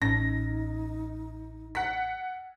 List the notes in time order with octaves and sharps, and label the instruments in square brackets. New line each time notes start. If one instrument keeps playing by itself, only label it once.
[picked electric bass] A1 [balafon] C#4 [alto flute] D#4 [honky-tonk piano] A#6
[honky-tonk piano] F#5 B6